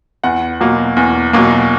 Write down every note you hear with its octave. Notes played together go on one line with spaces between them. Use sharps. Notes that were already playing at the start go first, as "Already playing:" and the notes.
E2 F#5
B2 F#3 A#3
E2
B2 F#3 A#3